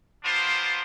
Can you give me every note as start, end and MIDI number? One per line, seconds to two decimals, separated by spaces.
0.24 0.82 58
0.24 0.82 59
0.24 0.82 62
0.24 0.82 65
0.24 0.82 72